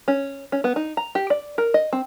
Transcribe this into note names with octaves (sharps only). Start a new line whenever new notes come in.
C#4
C#4
B3
D#4
A#5
G4
D5
A#4
D#5
C4